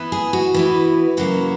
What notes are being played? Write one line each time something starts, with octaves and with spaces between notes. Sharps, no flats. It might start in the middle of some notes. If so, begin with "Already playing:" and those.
Already playing: E3 B3 E4
G#4
F#4
E3 B3 E4
C#3 F#3 A#3 E4 F#4